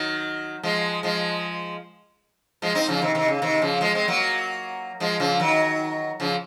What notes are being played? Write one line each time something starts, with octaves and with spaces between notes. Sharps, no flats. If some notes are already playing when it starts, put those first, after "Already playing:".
Already playing: D#3 F#3
F3 G#3
F3 G#3
F3 G#3
C4 D#4
C#3 F3
C3 D#3
C3 D#3
C#3
C3 D#3
C#3 F3
F3 G#3
G#3 C4
F#3 A#3
F3 G#3
C#3 F3
D#3 F#3
C#3 F3